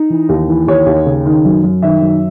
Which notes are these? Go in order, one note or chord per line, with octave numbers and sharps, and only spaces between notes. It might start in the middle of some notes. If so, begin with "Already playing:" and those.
Already playing: D#4
E3
D#2
E3
D#2 C#5
D#2
C#3
D#3
F#2
F#2
D#3 E5
F#2